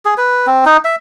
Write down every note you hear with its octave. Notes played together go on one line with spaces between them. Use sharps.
G#4
B4
C4
D#4
E5